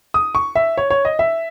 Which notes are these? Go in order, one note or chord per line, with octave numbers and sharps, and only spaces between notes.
D#6
C#6
E5
C#5
C#5
D#5
E5